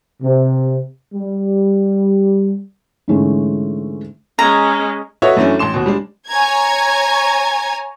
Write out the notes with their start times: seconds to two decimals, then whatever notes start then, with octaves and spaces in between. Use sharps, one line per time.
0.23 C3
1.15 G3
3.08 G#2 D3 E3 G#3 A3 C#4
4.39 G#3 C#4 A#5
5.22 F#4 A4 B4 C#5 D#5 E5
5.37 F#2 E3 A3 C#4 D4
5.59 A1 A5 C6 E7
5.74 D#2 B2
5.86 G3 G#3 D4
6.29 C#5 G#5 A#5 G#6